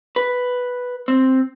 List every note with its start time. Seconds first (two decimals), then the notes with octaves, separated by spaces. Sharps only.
0.16 B4
1.08 C4